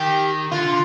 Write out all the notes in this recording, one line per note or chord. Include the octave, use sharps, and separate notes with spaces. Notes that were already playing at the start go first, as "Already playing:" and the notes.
Already playing: D#3 G4
D3 F4
D3